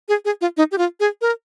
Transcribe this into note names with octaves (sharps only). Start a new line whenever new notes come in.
G#4
G#4
F4
D#4
G4
F4
G#4
A#4